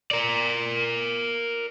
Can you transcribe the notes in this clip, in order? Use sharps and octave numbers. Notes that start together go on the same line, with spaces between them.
A#4 D5